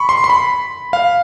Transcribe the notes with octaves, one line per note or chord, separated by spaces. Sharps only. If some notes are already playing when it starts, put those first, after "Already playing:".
Already playing: B5 C#6
C6
C6
B5
F5